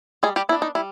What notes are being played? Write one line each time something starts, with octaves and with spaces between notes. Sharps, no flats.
G3 G#3 G#4
G3 G4
B3 D4 E4
D#4
G3 E4